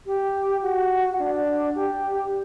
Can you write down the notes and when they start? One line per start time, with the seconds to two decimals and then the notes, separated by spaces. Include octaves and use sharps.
0.06 G4
0.62 F#4
1.19 D4
1.76 G4